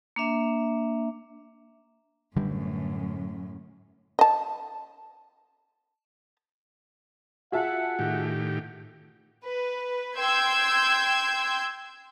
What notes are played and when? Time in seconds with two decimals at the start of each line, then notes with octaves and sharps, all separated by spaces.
0.16 A#3 D4 E5
2.36 F#2 A2 D3 G3
4.19 D#5 A5
7.52 F4 F#4 G#4 E5 F#5 A5
7.99 A2 D#3 G4
9.46 B4
10.18 G5 C6 E6 G6 G#6